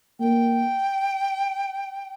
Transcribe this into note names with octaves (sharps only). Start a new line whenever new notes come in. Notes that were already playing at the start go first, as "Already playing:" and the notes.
A#3 G5